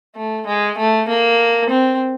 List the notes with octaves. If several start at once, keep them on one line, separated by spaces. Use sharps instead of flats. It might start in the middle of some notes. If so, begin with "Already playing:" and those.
A3
G#3
A3
A#3
C4